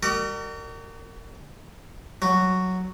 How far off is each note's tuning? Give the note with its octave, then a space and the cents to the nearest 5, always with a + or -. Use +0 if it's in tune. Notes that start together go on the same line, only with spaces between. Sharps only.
F#4 +40 A#4 -30 D5 +40
F#3 +0 F#4 +0